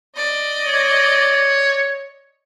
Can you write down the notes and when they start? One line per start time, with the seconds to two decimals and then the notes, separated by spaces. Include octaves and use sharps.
0.16 D5 D#5
0.66 C#5